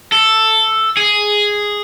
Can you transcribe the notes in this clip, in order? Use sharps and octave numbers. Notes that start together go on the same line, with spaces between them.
A4
G#4